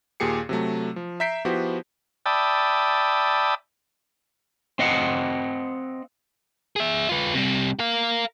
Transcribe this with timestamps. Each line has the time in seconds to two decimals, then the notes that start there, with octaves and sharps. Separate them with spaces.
0.20 D#2 A#2 G4 G#4 C7 C#7
0.49 C3 F#3 A3
0.96 F3
1.20 E5 A#5 G6 B6 C7 D7
1.45 F3 B3 E4 F#4 G4 C5
2.26 D5 E5 G5 A5 B5 D#6
4.79 C4 D#5 F5 F#5
6.76 G#4 E5
7.09 F4 B4
7.34 C3 G3
7.80 A#4 F5